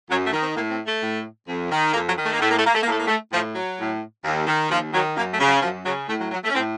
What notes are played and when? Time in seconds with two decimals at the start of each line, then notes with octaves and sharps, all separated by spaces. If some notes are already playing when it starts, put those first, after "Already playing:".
0.09 F#2 F#3
0.25 A3
0.32 D#3
0.40 C4
0.55 A2 A#3
0.70 C4
0.86 A3
1.02 A2
1.48 F2
1.71 D#3
1.93 F2 A#3
2.09 F#3
2.17 D#3
2.25 A3
2.33 A#3
2.39 A2 A3
2.50 A#3
2.57 A3
2.66 A#3
2.74 A3
2.82 A#3
2.86 A2 A3
2.99 A#3
3.07 A3
3.32 A2 F3
3.55 F#3
3.78 A2
4.24 D#2
4.47 D#3
4.70 D#2 F3
4.93 D#3 F#3
5.17 F#2 A#3
5.32 A3
5.40 C#3
5.47 F#3
5.62 F#2 F3
5.85 C#3 F#3
6.08 A2 A3
6.21 F#3
6.32 F#3
6.44 A3
6.49 C#4
6.55 A2 C4